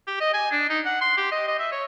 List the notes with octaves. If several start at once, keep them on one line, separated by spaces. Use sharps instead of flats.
G4
D#5
G#5
D4
D#4
F#5
C6
G4
D#5
D#5
E5
C#5